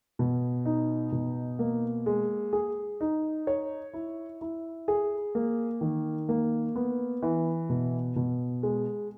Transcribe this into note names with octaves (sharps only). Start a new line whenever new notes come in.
B2
D#4
B2
A#3
G#3
G#4
D#4
C#5
E4
E4
G#4
A#3
D#3
A#3
B3
E3
B2
B2
G#3